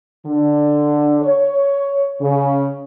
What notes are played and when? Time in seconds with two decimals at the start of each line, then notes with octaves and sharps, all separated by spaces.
0.26 D3
1.22 C#5
2.21 C#3